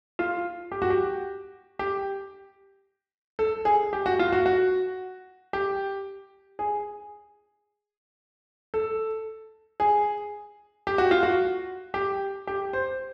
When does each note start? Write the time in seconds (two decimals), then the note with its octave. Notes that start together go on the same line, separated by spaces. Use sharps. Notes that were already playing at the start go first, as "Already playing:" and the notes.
0.19 F4
0.72 G4
0.82 F#4
0.90 G4
1.79 G4
3.39 A4
3.65 G#4
3.93 G4
4.06 F#4
4.19 F4
4.32 F#4
4.46 F#4
5.53 G4
6.59 G#4
8.74 A4
9.80 G#4
10.87 G4
10.98 F#4
11.11 F4
11.23 F#4
11.94 G4
12.47 G4
12.73 C5